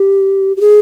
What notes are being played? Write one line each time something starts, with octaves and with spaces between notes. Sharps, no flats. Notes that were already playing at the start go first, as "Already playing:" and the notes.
Already playing: G4
G4
G#4